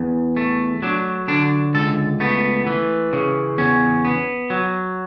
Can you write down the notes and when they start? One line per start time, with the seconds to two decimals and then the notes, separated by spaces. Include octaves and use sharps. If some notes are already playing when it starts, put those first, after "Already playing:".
Already playing: E2
0.37 A3
0.82 F#3 D4
1.28 D3 D4
1.74 C#2 A4
2.20 A3 B3
2.67 E3
3.13 C#3
3.58 E2 C#4
4.05 B3
4.50 F#3